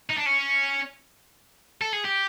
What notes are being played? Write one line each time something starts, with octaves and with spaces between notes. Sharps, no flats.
D#4
D4
C#4
A4
G#4
G4